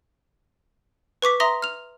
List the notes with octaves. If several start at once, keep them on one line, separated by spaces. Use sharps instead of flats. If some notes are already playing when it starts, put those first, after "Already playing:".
B4 C#6 D6 B6
E5 A#5 C6 D#6 A#6 G7
F6 F7